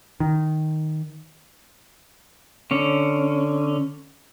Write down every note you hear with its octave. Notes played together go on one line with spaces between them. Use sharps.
D#3
D3 C#4